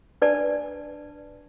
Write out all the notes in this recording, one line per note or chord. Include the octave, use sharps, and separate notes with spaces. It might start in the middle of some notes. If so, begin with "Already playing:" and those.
D4 B4 D5 G#5 A5